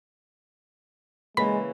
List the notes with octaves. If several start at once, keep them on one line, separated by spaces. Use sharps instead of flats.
C#3 E3 G#3 A#3 B5